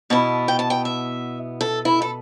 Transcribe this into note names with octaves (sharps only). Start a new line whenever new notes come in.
B2 B3 E4 A5
G5
A5
G5
E5
A4
E4
A4